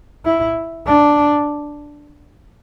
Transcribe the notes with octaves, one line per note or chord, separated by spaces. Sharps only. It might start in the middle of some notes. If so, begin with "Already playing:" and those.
E4
D4